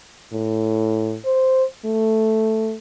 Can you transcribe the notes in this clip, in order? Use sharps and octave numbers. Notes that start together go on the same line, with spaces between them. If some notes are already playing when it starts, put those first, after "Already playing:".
A2
C5
A3